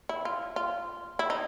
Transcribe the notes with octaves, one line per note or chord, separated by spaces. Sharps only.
E4
F4
F4
E4
D#4